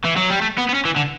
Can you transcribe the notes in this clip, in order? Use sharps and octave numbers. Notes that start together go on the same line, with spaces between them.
E3
F#3
G3
A3
B3
B3
C#4
E3
D3